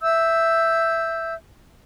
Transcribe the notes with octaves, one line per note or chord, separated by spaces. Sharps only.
E5 E6 G6